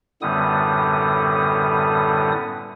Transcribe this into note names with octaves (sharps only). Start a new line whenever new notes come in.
F#2 A2 D3 G3 B3 D#6